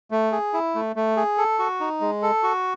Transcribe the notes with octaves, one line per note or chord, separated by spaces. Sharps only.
A3
G#4
E4
A3
A3
G#4
A4
F#4
D#4
G#3
A4
F#4